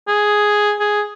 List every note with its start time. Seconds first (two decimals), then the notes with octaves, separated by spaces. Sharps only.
0.08 G#4
0.80 G#4